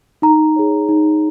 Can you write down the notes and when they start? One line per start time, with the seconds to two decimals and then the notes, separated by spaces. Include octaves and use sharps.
0.22 D#4 A#5
0.56 G#4 C#5
0.89 D#4